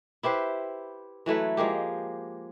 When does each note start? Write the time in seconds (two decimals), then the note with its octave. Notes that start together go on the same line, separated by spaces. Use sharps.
0.23 E4 G4 B4 C5
1.26 E3 F#3 A3 B4
1.57 F3 G#3 A#3 G4